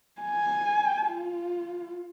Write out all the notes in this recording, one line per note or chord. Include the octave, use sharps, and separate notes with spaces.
G#5
F4